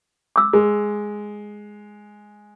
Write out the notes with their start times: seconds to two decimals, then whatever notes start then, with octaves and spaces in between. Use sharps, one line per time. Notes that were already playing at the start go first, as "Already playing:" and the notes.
0.36 D6 E6
0.53 G#3